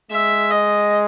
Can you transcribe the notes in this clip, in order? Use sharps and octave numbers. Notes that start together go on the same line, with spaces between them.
G#3 E5
D#5